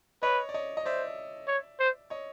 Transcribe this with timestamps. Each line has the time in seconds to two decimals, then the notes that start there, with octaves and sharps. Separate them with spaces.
0.23 B4 C#5 D#5
0.49 D5
0.54 C#5 D#5
0.77 D#5
0.86 C5 D5 E5
1.48 C#5
1.80 C5
2.10 C#5 D#5